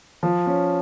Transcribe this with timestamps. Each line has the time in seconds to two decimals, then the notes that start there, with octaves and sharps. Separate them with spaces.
0.23 F3
0.47 C#4